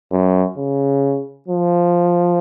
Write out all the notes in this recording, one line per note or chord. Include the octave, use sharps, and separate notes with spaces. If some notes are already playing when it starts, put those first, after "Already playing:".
F#2
C#3
F3